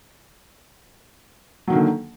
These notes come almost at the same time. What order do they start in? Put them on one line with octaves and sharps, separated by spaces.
F#3 D#3 A#3 D3